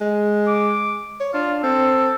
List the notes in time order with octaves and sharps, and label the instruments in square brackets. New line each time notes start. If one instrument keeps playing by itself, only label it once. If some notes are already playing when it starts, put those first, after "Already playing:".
[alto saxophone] G#3
[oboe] D6
[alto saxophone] C#5
[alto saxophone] D4 [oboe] F4
[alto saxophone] C4 [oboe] A4